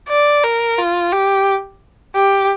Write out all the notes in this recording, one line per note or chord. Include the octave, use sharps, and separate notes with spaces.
D5
A#4
F4
G4
G4